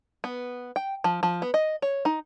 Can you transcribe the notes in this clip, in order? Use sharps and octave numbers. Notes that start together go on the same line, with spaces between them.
B3
G5
F3
F3
B3
D#5
C#5
D#4